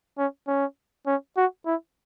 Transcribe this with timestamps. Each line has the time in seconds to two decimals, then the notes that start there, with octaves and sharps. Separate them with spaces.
0.18 C#4
0.47 C#4
1.07 C#4
1.37 F#4
1.66 E4